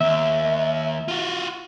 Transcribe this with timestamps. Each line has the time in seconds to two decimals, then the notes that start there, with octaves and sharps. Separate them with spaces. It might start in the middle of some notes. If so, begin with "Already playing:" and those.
0.01 D#2 E5
1.08 F4 F#4